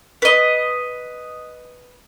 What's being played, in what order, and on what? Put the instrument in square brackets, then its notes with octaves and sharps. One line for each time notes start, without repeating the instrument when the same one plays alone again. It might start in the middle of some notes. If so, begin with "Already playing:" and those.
[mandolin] B4 D#5